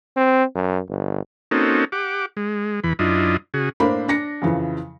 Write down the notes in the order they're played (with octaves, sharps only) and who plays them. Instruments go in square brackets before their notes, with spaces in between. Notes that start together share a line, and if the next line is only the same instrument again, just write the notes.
[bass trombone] C4
F#2
G1
[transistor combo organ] A#3 C4 C#4 D#4 F#4 A4
G4 F#5 D6
G#3
E2 E3 B5
F#2 D4 E4 F4 D#5
C#3 F#4 G#4
[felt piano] A2 A#3 D4 C5 B5
D4 A#6 C#7
F2 C#3 E3 F3